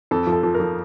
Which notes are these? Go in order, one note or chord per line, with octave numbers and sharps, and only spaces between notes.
F2 A4
F3
A4
F3
A#4
F3